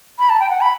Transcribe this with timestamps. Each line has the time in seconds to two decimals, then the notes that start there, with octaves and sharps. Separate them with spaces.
0.19 B5
0.29 A5
0.40 G5
0.50 F#5
0.61 B5